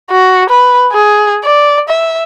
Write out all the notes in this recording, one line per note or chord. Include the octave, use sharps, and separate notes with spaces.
F#4
B4
G#4
D5
E5